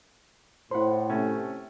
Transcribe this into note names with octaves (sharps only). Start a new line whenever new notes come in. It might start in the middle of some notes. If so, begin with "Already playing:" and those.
A2 E4 C5 F#5 B5 C6
C3 A3 C#4